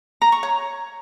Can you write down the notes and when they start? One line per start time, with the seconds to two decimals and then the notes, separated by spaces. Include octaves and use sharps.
0.22 A#5
0.32 C#6
0.43 C#5